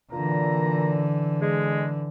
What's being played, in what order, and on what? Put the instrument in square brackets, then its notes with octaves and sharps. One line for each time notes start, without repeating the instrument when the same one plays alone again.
[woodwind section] A#2 A#5 [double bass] D3 E3
[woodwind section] G#3